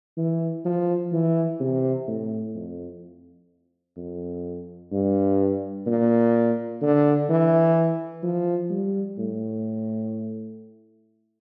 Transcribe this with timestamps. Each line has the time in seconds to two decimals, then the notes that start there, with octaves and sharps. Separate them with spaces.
0.17 E3
0.65 F3
1.12 E3
1.60 C3
2.07 A2
2.55 F2
3.97 F2
4.92 G2
5.86 A#2
6.82 D3
7.29 E3
8.23 F3
8.70 G3
9.18 A2